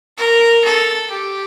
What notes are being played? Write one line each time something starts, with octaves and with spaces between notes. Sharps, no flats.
A#4
A4
G4